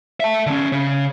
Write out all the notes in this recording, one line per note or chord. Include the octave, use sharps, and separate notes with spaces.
E5 A5
D3 C#4
C#3